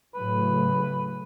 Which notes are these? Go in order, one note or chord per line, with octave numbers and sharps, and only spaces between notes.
A2 C#3 F#3 B4